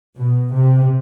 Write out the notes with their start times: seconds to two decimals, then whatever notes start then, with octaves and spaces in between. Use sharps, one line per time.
0.17 B2
0.52 C3